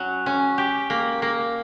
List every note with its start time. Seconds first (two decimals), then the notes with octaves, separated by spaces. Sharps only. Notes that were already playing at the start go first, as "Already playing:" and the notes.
Already playing: F#3 C#4
0.26 C#4
0.58 G4
0.90 A#3
1.22 A#3